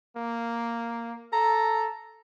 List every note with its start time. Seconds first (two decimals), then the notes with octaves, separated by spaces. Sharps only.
0.17 A#3
1.33 A4 A#5